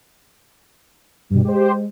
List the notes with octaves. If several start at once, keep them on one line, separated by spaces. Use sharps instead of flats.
G2 B2 G3
G#3 G4 C5